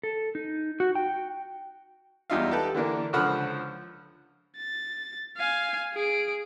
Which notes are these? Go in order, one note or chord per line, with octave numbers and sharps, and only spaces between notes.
A4
D#4
F#4
G5
E2 G3 D#4 F4 E5 F5
G4 A4 B4 G5 A5
D3 E3 A#3 D4
C#2 D3 F3 F#5 B5 F6
A6
F5 G#5
G#4 D7